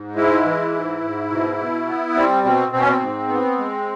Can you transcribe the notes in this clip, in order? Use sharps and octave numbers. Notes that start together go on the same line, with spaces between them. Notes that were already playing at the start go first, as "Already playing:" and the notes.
Already playing: G#2
G#3 E4
E3
G#2
G#2
B2
B2
B3
G3 C4
B2 C4
B2 C4
C#4
C4
G#2
B3
G#3